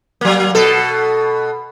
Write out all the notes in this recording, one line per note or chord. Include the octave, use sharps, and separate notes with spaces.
F#3 A#3
B2 A4